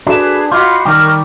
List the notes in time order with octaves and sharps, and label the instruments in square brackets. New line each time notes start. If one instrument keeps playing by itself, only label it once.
[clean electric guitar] D4 [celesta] F#4 A4 E7 [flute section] G#4 B4
[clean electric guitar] F4 [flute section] F#4 F5 B5 [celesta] D#5 D6 G6
[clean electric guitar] D#3 G3 G4 [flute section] A#4 C#6 F6